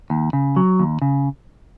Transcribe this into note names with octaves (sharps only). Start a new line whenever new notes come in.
D#2
C#3
F#3
D#2
C#3